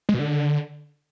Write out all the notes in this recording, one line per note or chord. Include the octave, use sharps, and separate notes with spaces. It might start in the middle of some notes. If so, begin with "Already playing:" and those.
G#3
B2
D3